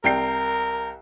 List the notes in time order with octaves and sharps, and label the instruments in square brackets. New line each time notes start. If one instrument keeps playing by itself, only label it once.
[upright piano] C2 G5 C7 [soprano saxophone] A#4